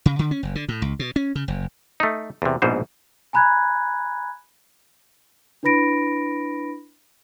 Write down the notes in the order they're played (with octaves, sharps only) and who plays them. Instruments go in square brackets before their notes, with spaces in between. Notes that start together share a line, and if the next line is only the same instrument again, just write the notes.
[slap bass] C#3
D3
C#4
F#1
D3
A2
C#2
B2
C#4
C#3
F#1
[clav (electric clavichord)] A3 D#4
E2 C3
A#1 G#2 B2 C5
[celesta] G#5 A#5 B5 F#6 G#6
D4 E4 B4 B5 A#6 D7